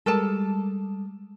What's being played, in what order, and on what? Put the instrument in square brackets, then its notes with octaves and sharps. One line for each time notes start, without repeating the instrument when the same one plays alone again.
[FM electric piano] G3 G#3 [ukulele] A4 A#4 A5